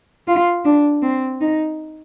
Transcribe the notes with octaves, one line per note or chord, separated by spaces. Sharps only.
F4
D4
C4
D#4